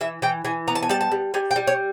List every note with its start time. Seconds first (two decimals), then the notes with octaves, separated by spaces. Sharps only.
0.01 E3 E5
0.22 E3 G5
0.45 E3 G#5
0.68 B3 A#5
0.75 A5
0.83 G#5
0.89 G3 A5
1.01 A5
1.12 G3
1.34 G3 G#5
1.51 G5
1.56 G3
1.67 C#5